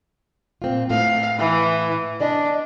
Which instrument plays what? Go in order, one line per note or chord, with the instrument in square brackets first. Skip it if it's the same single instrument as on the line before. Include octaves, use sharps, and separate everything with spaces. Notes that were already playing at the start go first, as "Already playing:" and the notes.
[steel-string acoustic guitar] A#2 C4 F4
[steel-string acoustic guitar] A2 B3 [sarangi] F5
[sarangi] E3
[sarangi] D4 [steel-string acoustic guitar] D5 D#5 G#5